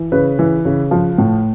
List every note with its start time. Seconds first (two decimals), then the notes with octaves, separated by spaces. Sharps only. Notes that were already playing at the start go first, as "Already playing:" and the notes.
Already playing: E3
0.12 C#3 B4
0.39 E3
0.65 C#3
0.91 F3
1.18 A2